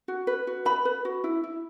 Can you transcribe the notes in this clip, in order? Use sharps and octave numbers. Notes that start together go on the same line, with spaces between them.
F#4
B4
F#4
B4 B5
B4
F#4
E4
E4